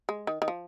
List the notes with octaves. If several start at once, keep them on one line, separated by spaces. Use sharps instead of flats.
G#3
D#3
D#3
F3